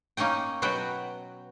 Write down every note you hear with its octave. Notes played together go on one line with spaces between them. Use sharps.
A#3 C#4 D#4 D#5 G5
B2 F#3 B3 F#4 F#5 G5